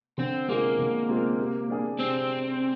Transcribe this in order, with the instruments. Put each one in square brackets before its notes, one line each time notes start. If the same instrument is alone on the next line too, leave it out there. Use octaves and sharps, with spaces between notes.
[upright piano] D3 [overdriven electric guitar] C4
[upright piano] G#3 C4 F4 G#4 [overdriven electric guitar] A#3
[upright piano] D3
G#3 C4 F4 G#4
C3
G3 D4 G#4
[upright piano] C3 [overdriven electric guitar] C4